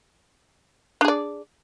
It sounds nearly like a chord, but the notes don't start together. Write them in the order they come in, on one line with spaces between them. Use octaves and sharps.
D4 G#4 D5